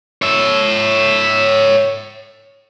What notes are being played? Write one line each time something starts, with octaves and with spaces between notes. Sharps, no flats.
C#5 E5